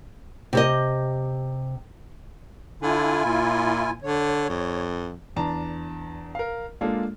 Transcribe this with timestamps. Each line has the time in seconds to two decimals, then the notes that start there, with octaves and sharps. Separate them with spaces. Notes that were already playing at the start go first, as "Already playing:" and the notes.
0.53 C3 G4 D#5
2.82 D3 E4 F4 G#5
3.26 A#2
4.03 D3 C#5
4.49 F2
5.36 E2 D4 A5 A#5
6.35 A#4 F5
6.81 G#3 A#3 D4 F4 A4